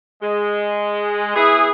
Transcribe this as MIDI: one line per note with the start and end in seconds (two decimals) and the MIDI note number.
0.22 1.34 56
1.36 1.71 59
1.36 1.71 64
1.36 1.71 68